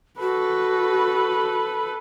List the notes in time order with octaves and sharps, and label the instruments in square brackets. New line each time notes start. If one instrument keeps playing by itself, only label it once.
[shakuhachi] F#4 [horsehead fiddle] A4 B4